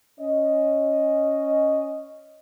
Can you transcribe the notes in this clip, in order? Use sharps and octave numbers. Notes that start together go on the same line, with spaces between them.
C#4 D#5